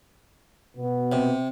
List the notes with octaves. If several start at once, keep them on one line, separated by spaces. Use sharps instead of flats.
B2 B3
C3